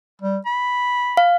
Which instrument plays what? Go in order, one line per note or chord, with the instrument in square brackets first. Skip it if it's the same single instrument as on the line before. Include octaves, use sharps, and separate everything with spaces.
[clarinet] G3
B5
[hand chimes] F5